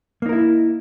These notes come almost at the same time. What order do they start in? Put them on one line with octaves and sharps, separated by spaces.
A#3 D#4 A#4 E4